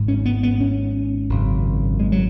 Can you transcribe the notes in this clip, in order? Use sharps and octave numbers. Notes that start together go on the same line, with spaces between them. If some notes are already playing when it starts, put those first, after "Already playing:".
Already playing: G#1 G#2
C#4
B3
B3
C#4
G#1 F#2 C#3
G#3
F#3